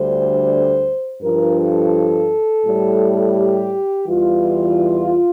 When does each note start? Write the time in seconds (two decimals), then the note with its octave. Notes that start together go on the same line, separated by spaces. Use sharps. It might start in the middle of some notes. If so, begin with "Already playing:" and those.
Already playing: D2 D3 G3 C5
1.21 G2 F3 A#4
1.57 A4
2.65 A2 G3
3.36 G4
4.07 E2 E3 G3 F4